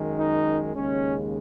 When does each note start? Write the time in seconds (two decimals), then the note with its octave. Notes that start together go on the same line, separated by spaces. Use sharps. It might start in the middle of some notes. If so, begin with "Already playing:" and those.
Already playing: F#2 D#3 G#3
0.17 D#4
0.75 D#2 C#3 G#3 C#4